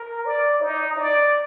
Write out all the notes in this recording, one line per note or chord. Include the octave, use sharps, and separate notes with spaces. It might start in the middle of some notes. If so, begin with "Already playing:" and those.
Already playing: A#4
D5
D#4
D5